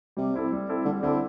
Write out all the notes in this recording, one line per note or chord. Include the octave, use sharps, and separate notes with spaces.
C3 G3
C4 E4 A4
G3
C4 E4 A4
D3 G3
D3 C4 E4 A4